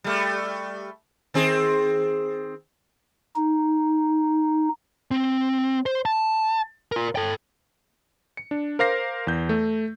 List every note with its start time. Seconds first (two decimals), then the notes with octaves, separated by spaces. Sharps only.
0.04 G3 A3
1.34 D#3 C4 G#4
3.36 D#4
5.11 C4
5.86 C5
6.05 A5
6.92 F4 A#4
7.16 A4 G5
8.37 C#7
8.51 D4
8.79 A#4 C5 F5 D6 A#6 C7
9.27 E2 G6
9.49 A3